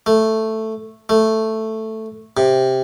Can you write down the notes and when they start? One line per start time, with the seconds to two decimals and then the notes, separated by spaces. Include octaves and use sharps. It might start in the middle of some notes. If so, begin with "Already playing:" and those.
0.06 A3
1.09 A3
2.37 C3